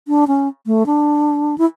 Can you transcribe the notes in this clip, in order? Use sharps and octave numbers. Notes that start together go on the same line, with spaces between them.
D4
C#4
A3
D4
E4